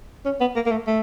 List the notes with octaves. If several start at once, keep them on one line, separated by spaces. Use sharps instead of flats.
C#4
B3
A#3
A#3
A3
A3